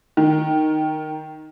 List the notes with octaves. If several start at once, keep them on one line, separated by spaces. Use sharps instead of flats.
D#3